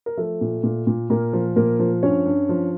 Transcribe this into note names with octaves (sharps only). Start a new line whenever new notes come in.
A#4
F3 A3 A4
A#2
A#2
A#2
A#2 A#3 A#4
F3
A#2 A#3 A#4
F3
G2 C#4 C#5
G2
F3